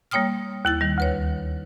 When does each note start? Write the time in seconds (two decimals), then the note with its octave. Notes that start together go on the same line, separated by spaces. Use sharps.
0.11 G3 A#3 C#5 G5 D#6 F6
0.65 D#2 E4 A6
0.81 D#3 G3
0.98 D2 B4 C#5